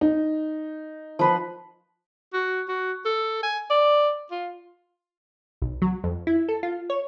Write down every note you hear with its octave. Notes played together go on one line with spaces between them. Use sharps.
D#4
F3 B4 C6
F#4
F#4
A4
G#5
D5
F4
B1
F#3
F2
E4
A4
F4
C#5